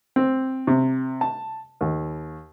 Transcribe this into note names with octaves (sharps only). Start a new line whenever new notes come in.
C4
C3
A5
D#2